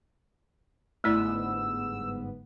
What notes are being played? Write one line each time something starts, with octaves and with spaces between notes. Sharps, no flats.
G1 G#2 A3 B3 E4 D5 E6